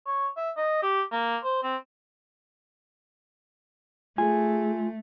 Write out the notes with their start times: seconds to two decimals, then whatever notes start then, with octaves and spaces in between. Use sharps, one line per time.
0.06 C#5
0.37 E5
0.57 D#5
0.82 G4
1.12 A#3
1.44 C5
1.63 C4
4.18 A3 F4 G#4 G#5